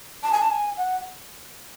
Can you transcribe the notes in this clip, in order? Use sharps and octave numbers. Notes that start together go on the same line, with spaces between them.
A5
G#5
A5
G#5
F#5